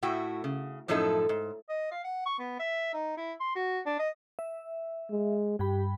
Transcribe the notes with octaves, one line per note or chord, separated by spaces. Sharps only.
A2 E4 F#4 G5
C#3
F#2 A2 F3 D#4 E4 A4
G#2
D#5
F5
F#5
C#6
B3
E5
D#4
E4
C6
F#4
D4
D#5
E5
G#3
G2 G4 G5 B5